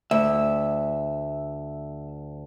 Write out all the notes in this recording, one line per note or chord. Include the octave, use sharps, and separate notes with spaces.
D2 E5